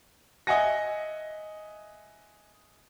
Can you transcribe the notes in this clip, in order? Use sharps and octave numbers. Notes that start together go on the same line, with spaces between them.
D#5 E5 F#5 G#5 A#6